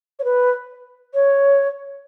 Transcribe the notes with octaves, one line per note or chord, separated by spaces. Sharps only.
C#5
B4
C#5